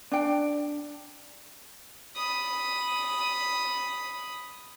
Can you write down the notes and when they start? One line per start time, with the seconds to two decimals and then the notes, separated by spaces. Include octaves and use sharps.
0.11 D4 G5
2.16 B5 D#6